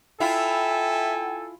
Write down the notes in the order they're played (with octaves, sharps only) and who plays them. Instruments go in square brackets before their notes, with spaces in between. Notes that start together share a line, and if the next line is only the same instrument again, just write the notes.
[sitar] E4 F4 [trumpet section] A4 G#5 [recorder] E5 [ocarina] G5